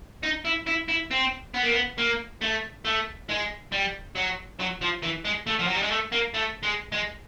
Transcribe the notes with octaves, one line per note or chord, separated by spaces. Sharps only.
D#4
E4
E4
E4
C4
B3
A#3
B3
A#3
A3
A3
G#3
G3
F#3
F#3
F3
E3
G#3
A3
F3
F#3
G3
G#3
A3
A#3
A3
G#3
G#3